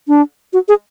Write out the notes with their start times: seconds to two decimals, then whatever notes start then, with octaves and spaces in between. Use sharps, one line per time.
0.08 D4
0.53 F#4
0.68 G#4